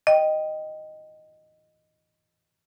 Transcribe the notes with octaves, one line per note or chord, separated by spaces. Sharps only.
D#5 G5